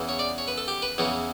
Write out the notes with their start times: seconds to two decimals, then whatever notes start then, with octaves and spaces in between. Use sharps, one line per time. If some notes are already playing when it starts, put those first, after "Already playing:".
Already playing: E2 C#3 E3
0.09 C#5
0.19 D5
0.38 C#5
0.48 B4
0.58 A4
0.68 G4
0.82 B4
0.98 E2 C#3 E3 C#5